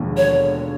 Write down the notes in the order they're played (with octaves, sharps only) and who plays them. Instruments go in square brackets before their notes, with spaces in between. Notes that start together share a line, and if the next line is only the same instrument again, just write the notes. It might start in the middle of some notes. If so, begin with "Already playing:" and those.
Already playing: [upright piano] E1 D#2 D3 F3 G#3
[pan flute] C#5